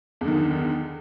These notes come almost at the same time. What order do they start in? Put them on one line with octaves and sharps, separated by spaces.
E2 D3 D#3